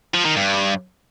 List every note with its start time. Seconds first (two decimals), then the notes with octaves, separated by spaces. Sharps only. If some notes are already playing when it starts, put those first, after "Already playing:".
0.14 F3
0.25 D#3
0.36 G2